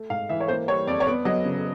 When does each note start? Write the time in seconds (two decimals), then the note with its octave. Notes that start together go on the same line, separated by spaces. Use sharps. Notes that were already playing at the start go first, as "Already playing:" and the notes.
Already playing: A3
0.10 G#2 F5
0.29 E3 E5
0.40 C#5
0.48 A#3 C5
0.68 G3 C#5
0.87 F2 D5
1.00 C#5
1.07 B3 D5
1.25 F#3 D#5
1.45 C#3